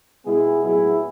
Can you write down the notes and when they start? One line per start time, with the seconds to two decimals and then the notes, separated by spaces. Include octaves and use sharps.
0.24 B2 G#3 B3 E4 G#4
0.63 A2 F#3 B3 E4 G#4